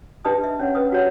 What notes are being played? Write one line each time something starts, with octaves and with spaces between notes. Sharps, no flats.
D4 G4 B4 D#5 A5 D#6
E5
C#4 C#5 F#5
C#4 B4 D#6
F#4 G4 C#5 F#5